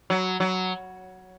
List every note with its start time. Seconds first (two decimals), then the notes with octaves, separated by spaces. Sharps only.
0.10 F#3
0.40 F#3